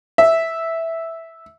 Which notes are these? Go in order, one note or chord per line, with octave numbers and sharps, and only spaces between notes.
E5